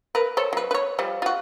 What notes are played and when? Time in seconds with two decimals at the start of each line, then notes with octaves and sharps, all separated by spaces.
0.15 A#4 B4
0.37 A4 C5 C#5
0.53 F#3 B4
0.71 B4 C#5
0.98 F3 G3
1.22 F4 F#4